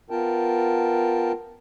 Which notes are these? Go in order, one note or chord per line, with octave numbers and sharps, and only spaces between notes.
B3 F4 A#4 G5 A5